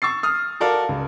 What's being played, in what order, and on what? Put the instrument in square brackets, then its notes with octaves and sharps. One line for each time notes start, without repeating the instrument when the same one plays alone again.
[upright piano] C#6 E6 A6 C7
D#6 F6
F#4 A4 A#4 D5 F5
C#2